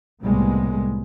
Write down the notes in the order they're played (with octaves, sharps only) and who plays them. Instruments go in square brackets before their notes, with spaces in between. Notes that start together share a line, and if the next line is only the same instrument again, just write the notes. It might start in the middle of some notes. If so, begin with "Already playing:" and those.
[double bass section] C2 A2 G3 G#3 A#3 B3